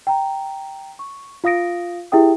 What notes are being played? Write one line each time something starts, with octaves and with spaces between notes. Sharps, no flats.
G5 A#5
C#6
F4 F5 D#6 A#6 D7
E4 G4 G#4 E5 G5 D#6